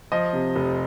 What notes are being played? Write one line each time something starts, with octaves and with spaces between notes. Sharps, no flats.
F3 D#5
C3
F1